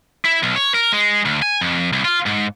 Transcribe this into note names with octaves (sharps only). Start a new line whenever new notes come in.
E4
B1
C#5
A#4
G#3
D2
G#5
F2
C2
F4
G#2